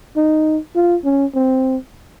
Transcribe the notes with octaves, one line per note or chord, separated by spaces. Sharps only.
D#4
F4
C#4
C4